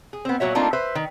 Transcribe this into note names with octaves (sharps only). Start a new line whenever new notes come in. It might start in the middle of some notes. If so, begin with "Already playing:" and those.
G#4
B3 C4
A#2 F#3 F#4 C#5 E5
A3 A#3 C4 D4 D#4 F4
B4 C5 E5
D#3